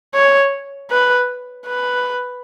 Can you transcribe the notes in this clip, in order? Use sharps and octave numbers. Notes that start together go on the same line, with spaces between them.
C#5
B4
B4